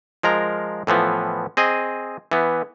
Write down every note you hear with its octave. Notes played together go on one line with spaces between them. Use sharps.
F3 G#3 A#4 A#5
A2 E3 F3 B3
C4 G#4 D#5
E3 B3